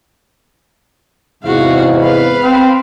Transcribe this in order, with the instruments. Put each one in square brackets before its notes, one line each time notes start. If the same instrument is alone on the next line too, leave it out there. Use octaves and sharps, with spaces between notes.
[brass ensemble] E2 G#2 C3 [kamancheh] F#4 F5
[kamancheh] B4 F5
[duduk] C4